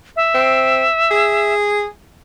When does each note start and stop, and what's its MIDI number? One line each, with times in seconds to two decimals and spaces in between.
0.16 1.54 76
0.34 0.84 60
1.11 1.84 68